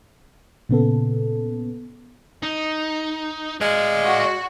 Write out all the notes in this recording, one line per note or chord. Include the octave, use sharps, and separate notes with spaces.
A#2 C#3 B3 A4
D#4
G#3 D5 F5
F#4